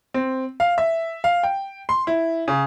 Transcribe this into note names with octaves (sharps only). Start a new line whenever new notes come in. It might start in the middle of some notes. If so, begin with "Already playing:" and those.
C4
F5
E5
F5
G5
C6
E4
C#3